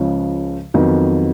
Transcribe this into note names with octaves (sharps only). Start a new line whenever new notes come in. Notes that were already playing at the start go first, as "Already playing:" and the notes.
Already playing: C#2 C#3 F3
F2 D#3 F#3 B3